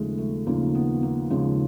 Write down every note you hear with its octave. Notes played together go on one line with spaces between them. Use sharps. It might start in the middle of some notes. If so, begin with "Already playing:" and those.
Already playing: D#2 C#3 F3 G#3 A3
A3
D#2 C#3 F3 A#3
B3
A#3
D#2 C#3 F3 G#3